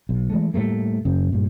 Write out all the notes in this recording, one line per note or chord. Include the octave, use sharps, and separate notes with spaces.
B1
E3 G#3 A3
A2 G3 A3 A#3
F#2 C#3
G2 A#2